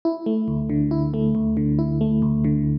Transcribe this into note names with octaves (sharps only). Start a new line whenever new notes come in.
E4
A3
D2
D3
E4
A3
D2
D3
E4
A3
D2
D3